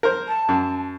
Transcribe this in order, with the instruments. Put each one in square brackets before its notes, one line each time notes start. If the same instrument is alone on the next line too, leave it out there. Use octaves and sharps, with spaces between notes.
[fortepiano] A#4 C5
[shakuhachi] A5
[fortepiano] F#2